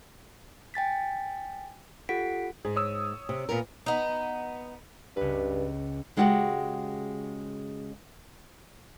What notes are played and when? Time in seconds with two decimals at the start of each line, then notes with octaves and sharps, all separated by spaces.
0.74 G5 G#5 A6 B6
2.09 F4 G4 A4 F#5 B6 D7
2.65 G#2 G#4
2.76 C#5 D#6 E6
3.29 C3
3.49 A#2 B3 A#4
3.86 B3 D#4
5.17 C#2 G2 B4
6.17 C#3 G#3 E4 F#4 G4 F#5